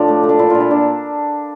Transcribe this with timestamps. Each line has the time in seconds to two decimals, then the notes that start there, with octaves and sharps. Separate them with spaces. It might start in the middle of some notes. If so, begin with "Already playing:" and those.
Already playing: A2 F3 D4
0.08 A3
0.23 A3
0.29 D4
0.39 A#2 E4
0.50 A#2 F4
0.60 E4
0.70 A#2 D4